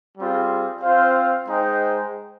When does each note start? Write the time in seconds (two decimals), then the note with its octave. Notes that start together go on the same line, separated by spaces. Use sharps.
0.18 G3 C4 F4 G#4
0.83 C4 F4 C5 F5
1.47 G#3 D#4 G#4 C5 G5